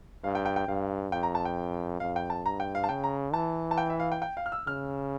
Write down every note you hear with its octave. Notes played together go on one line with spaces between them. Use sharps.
G2 F5
G5
G5
G5
G2 F5
F2 G5
A#5
A5
G5
F2 F5
G5
A5
G2 A#5
G5
F5
A5
C#3 G5
A#5
E3 A5
A5
G5
E5
F5
G5
G5
F5
F6
E6
C#3 F6